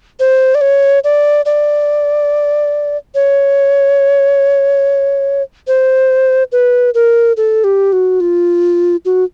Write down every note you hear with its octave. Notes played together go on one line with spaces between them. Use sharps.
C5
D5
C#5
D5
D5
C#5
C5
B4
A#4
A4
G4
F#4
F4
F#4